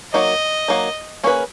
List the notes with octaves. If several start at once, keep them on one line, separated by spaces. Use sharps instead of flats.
F#3 A#3 D#4 D#5
F#3 A#3 D#4
A#3 C#4 G#4 B4